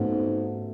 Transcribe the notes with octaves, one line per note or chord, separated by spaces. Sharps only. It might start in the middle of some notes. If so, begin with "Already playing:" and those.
Already playing: G#2 F#3 A3 B3 C#4